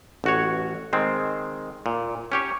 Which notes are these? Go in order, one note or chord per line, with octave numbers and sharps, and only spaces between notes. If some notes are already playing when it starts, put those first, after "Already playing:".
A1 F#4 C#5
D#3 G#3 C4
A#2
C#4 G4 C#5